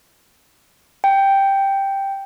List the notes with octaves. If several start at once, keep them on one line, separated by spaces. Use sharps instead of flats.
G5